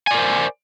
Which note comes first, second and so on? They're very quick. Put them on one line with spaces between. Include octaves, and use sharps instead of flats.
G#5 D5 A#4 C5